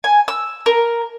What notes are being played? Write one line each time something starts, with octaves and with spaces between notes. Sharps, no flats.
G#5
E6
A#4